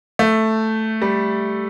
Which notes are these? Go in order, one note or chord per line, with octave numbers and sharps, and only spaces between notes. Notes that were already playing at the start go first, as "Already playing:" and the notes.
A3
G3